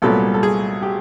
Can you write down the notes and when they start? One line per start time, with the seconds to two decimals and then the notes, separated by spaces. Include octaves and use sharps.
0.02 C2 A#2 F#3 B3 A4
0.34 A4
0.43 G#4
0.83 G4